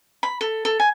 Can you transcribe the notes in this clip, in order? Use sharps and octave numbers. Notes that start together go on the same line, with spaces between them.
B5
A4
A4
G#5